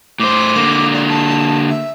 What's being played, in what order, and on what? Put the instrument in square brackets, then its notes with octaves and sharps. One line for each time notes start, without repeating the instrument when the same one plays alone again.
[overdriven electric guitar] A2 C5 [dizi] D6
[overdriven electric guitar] D3 A#3
[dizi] D5
A5
E5